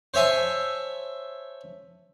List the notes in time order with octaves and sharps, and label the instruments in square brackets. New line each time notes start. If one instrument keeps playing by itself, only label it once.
[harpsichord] C5 C#5 E5 G#5 A5